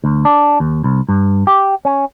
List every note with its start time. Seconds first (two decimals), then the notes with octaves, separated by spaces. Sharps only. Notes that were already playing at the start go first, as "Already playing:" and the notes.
0.04 D2
0.25 D4
0.60 D#2
0.84 C2
1.09 G2
1.47 G4
1.85 C#4